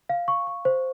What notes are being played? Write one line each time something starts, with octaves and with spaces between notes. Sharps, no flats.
F5
C#6
C#6
C5